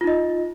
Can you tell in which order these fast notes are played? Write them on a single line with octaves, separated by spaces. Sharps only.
F4 D#4 D#5